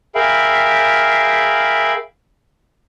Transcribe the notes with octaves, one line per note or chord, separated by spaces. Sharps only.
G#4 A#4 E5 F5 G5 B5